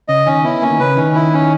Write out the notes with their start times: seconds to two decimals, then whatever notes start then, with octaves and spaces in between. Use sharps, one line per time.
0.08 C#3 D#5
0.26 D#3 C#4
0.44 B3 E4
0.62 A#3 C#4
0.71 D#3
0.80 C#3 B4
0.97 D#3 C#4
1.15 E4
1.33 C#4